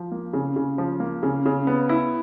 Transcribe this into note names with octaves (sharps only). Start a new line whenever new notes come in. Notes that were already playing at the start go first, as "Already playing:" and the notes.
Already playing: F3
A#3
C#3
C#3
F3
A#3
C#3
C#3
B3
E4